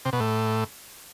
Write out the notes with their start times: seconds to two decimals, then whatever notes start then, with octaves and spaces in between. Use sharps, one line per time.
0.05 C3
0.13 B2
0.20 A2